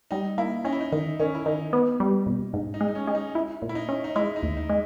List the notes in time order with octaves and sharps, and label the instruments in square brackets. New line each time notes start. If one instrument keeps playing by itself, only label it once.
[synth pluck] G3 [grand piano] D#4
[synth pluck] A#3 [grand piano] E4
[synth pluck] C#4 [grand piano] D#4
[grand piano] E4
D#4
[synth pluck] D#3 [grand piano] D#4
[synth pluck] D#3 [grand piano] C#4
[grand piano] E4
[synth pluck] D#3 [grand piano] D#4
[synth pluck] B3
G3
B2
G#2
[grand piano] D#4
[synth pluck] G#3
[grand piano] D#4
C#4
[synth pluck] G#3
[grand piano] D#4
[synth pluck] E4
A#2
[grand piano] E4
D#4
[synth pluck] C#4
[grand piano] D#4
[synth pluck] G#3 [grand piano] E4
[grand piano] D#4
[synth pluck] D#2
[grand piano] D#4
[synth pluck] G#3